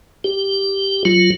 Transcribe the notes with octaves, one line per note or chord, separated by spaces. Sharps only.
G4
F#3 F4